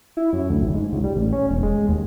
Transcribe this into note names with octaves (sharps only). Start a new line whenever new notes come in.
E4
F#2
D2
G#1
G#2
C#2
G3
A1
C#4
E1
G#3
D#2